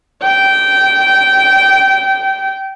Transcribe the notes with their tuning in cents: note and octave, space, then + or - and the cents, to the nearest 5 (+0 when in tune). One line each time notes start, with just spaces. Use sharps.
G5 -20